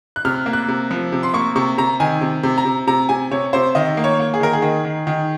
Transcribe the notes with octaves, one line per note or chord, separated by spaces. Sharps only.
F#6
C3 F6
A#3
F#6
C3
F3
C3
C6
A#3 C#6
C3 C#6
C3 A#5
D#3 G#5
C3
C3
A#5
C3
C3 A#5
C3 G#5
C3 C#5
C3 C5
D#3 D#5
A#3
C#5
A#3
G#4
D#3 A#4
G#4
D#3
D#3
D#3